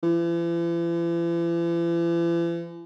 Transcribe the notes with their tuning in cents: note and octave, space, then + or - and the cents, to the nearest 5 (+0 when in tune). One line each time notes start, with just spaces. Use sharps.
E3 +45